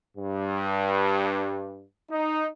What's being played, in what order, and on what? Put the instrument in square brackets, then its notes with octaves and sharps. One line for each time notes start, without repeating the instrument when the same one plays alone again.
[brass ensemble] G2
D#4